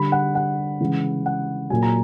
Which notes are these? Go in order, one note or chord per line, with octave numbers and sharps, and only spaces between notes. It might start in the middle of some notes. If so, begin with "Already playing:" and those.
Already playing: D3 G3 B5
F#5
F#5
C#3 E3 G#3
F#5
A#2 F#3 G#5
A#5